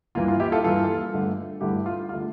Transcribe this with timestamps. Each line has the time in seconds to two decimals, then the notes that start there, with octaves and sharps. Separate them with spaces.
0.15 G2 E3 A#3 F4
0.28 F4
0.40 E4 G4
0.52 F4 A4
0.64 G2 E3 A#3 F4 A4
1.13 G2 D3 A3
1.61 G2 D3 A3 E4 G4
1.86 F4
2.09 F4
2.13 D3 A3